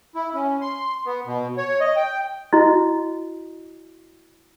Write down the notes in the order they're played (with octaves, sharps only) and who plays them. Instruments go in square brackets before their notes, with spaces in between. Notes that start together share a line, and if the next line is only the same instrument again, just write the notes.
[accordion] E4
C#4
C6
B3
B2
C#5
D#5
G5
[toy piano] E4 F#4 D#5